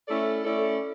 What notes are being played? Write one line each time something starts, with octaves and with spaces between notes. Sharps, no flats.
A3 C#4 E4 A4 D5
A3 C#4 E4 A4 D5